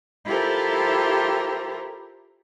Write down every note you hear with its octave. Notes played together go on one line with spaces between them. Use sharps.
E4 F4 G4 A4 A#4 C5